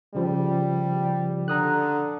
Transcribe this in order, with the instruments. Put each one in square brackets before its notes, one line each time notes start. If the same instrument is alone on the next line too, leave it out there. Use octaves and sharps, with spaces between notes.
[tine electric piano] C#3 F3 [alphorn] G3
[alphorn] D3 [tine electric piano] A#5 D#6 F#6